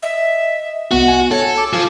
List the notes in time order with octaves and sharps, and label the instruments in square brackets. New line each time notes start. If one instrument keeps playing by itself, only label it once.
[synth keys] D#5 [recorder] E5
[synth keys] C2 B3 [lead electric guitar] F#4 [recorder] F#5
[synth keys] G#5
[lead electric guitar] A4 [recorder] C#5
[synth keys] D6 [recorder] E6
[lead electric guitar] F3 F4 [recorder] G#5